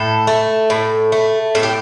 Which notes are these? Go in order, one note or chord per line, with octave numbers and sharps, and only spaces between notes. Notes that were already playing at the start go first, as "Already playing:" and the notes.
Already playing: A2 A4
A3
A2
A3
A2 A4
G4